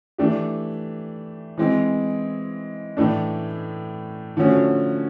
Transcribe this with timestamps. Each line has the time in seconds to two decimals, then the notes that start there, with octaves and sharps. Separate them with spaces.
0.18 E3 A3 D4 G4
1.58 E3 G#3 C4 E4
2.97 A2 E3 A3 D4
4.37 D3 F3 A3 C#4 F#4